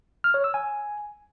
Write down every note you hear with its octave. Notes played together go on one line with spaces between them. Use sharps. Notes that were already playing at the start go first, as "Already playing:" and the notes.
F6
C#5
E6
G#5